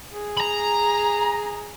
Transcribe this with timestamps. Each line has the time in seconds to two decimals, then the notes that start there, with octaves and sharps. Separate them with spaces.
0.10 G#4
0.38 A#5 B5